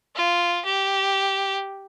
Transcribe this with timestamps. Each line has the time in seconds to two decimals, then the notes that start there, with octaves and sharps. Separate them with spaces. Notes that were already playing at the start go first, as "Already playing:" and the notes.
0.15 F4
0.65 G4